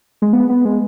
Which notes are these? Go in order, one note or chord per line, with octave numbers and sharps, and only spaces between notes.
G#3
B3
B3
G#3